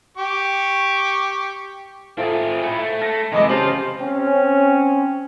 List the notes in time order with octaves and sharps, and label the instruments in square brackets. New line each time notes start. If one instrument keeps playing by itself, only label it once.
[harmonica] G4 C#6
[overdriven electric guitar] C4 G#4 [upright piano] F4 A4 E5
[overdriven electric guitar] A3 E4
[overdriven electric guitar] A3 [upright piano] E5
[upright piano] A5 A#6
[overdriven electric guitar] C3 [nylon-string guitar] E3 G#3 [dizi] D#5 [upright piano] G#5 B5 D6
[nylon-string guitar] C#3 G4 A5 [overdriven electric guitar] F4 [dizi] C5 [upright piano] C7 F#7
[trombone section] C4 C#4